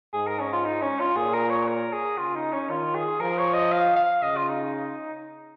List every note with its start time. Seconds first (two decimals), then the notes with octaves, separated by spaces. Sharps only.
0.13 G#2 G#4
0.27 A#4
0.40 C#4
0.53 F4
0.65 D#4
0.82 C#4
1.00 F4
1.16 A#2 G#4
1.34 A#4
1.50 C#5
1.67 A#4
1.93 G#4
2.18 C#3 F4
2.35 D#4
2.52 C#4
2.69 D#3 F4
2.95 G#4
3.20 F3 A#4
3.38 C#5
3.54 D#5
3.72 F5
3.96 F5
4.22 C#3 D#5
4.37 F4
4.48 D#4